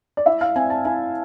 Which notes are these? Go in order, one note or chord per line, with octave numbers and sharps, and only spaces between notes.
D5
E4 E5
F5
C4 G#5
A5
E4 G#5